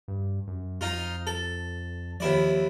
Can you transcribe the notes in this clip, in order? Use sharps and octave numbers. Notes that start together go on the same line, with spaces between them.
G2
F#2
F2 D#4 F4
A4
D#2 F3 E4 D5